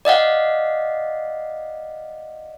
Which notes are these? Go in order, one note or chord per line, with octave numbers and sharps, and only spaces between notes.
D5 D#5 F5 F#5